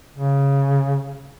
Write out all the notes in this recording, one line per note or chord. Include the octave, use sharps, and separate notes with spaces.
C#3